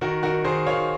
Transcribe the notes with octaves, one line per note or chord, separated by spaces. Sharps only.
D#3 F#4 A#4
D#3 F#4 A#4
D#3 G#4 C5
D#3 C#5 F5